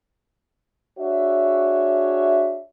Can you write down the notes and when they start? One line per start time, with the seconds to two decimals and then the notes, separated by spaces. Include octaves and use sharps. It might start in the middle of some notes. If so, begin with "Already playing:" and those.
0.99 D4 F#4 G#4 C#5 E5